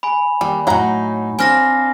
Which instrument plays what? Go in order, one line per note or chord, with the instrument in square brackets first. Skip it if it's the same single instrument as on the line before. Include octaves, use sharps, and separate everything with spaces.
[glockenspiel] G#5 B5
[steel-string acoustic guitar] D#2 [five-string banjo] G3
[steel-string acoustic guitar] A2 D#4 [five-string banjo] F#3 F#5 A#5
[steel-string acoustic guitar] C4 D4 F5 [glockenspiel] G#5 F6 A#6